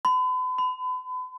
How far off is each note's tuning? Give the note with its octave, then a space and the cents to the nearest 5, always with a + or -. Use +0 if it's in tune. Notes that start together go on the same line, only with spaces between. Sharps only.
B5 +40
B5 +35